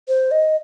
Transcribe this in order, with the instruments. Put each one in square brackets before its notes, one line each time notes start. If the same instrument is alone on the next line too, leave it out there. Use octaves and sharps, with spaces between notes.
[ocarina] C5
D#5